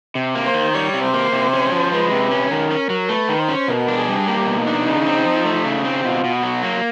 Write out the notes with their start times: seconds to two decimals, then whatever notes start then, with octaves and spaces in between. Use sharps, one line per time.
0.15 C3
0.35 A#3
0.45 C5
0.54 D#3
0.74 G3 C#5
0.94 C3
1.03 C5
1.14 A#3
1.33 C3
1.53 C#4
1.72 F3
1.92 G#3 B4
2.11 C3
2.31 C#4
2.51 D#3 A#4
2.71 C#4
2.90 F#3
3.09 A3 B4
3.29 D#3
3.39 C5
3.49 C#4
3.68 B2 A#4
3.88 D4
3.98 G#4
4.08 G3
4.28 A#3 G4
4.47 B2
4.58 D#4
4.67 D4
4.86 C#3
5.06 C4
5.25 F3
5.45 A3
5.65 C#3
5.84 C4
6.04 B2 F4
6.24 B2
6.33 F#4
6.43 F#3
6.63 A#3